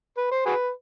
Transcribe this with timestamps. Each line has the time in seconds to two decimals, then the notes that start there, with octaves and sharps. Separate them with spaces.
0.18 B4
0.31 C5
0.46 F#4 G#4 B4